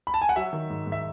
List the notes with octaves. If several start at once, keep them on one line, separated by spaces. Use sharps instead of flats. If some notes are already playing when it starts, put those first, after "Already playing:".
B5
A5
G#5
F#5
F#3 E5
D#3
G#2
G#2
E5